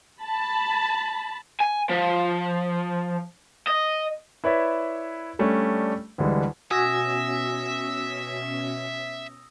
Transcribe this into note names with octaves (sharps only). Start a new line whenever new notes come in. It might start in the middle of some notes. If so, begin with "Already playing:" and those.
A5 B5
G#5
F3
D#5
E4 B4 C#5 D5 E5
G3 A3 C#4 D4 G4
D2 D3 E3 G3 G#3
B2 C#4 F#4 E5 G#5 D#6 E6 A#6